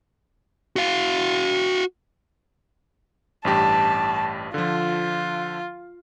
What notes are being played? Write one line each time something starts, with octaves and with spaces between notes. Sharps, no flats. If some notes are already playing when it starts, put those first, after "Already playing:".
F#4 F5
A1 G2 G4 A5
D3 F3 F4